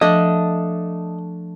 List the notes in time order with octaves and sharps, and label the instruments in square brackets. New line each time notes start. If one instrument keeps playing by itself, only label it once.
[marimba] F3 [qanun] A3 D4 [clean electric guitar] D#5